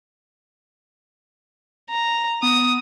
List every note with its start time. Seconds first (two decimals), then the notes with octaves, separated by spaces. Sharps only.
1.90 A#5
2.43 B3 D#6